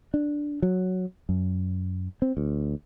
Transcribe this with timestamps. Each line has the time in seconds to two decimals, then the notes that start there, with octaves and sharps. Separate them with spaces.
0.14 D4
0.62 F#3
1.29 F#2
2.22 C4
2.37 D2